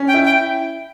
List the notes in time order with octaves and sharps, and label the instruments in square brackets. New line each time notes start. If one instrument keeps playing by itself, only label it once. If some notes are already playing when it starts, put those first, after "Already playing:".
Already playing: [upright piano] C#4
[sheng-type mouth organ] G5
[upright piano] E4
[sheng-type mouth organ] G5